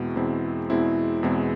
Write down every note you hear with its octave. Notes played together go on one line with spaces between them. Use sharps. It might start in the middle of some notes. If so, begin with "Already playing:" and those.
Already playing: E2 B2 G#3 C4 E4
E2 B2 G#3 C4 E4
E2 B2 G#3 C4 E4
E2 B2 G#3 C4 E4